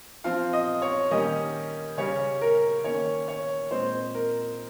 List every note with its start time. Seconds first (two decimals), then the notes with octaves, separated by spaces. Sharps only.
0.24 F3 C4 F5
0.53 D#5
0.82 C#5
1.11 D#3 G3 A#3 C#4 D#5
1.97 C#3 G3 C#4 C#5
2.41 A#4
2.84 D#3 A#3 C#4 C#5
3.28 C#5
3.71 A#2 G#3 C4 C5
4.15 A#4